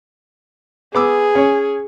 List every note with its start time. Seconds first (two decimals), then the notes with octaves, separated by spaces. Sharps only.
0.95 B3 G#4 D6 E6
1.35 C#4 C#5